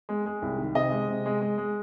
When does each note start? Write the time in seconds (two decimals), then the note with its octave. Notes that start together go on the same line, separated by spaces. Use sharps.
0.09 G#3
0.26 G#3
0.42 C2
0.59 D#3
0.75 C3 D#5
0.92 G#3
1.09 C3
1.26 G#3
1.41 G#3
1.58 G#3